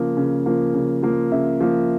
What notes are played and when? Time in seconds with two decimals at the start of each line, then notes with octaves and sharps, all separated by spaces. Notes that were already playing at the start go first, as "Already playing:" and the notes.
Already playing: C#3 F3 A#3
0.17 C#3
0.46 F3 A#3
0.74 C#3
1.03 F3 A#3
1.31 C#3 E5
1.61 F3 A#3